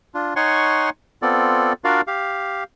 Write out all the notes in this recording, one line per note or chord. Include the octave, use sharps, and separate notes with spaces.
D4 F4
D#4 C#5 F#5 G#5 C6 C#6
B3 C4 F4 A4 D5
D4 F4 F#4 A#4 D5 F5
G4 F5